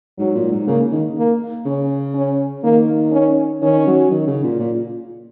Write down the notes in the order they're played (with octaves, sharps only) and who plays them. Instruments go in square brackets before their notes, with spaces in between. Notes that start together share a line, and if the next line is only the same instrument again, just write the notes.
[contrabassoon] G#2 [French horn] F#3
[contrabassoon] A#2
G#2
[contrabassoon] C#3 [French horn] A#3
[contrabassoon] D#3
[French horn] A#3
[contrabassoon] C#3 [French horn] C#4
[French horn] C#4
[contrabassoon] D#3 [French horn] A#3
[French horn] C#4
[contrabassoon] D#3 [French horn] C#4
[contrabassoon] F#3
D#3
C#3
A#2
A#2